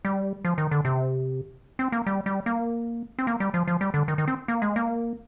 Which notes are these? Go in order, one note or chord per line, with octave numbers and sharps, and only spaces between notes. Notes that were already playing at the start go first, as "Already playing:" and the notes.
G3
F3
D#3
D3
C3
C4
A#3
G3
G3
A#3
C4
A#3
G3
F3
F3
G3
D3
D#3
D#3
C4
A#3
G#3
A#3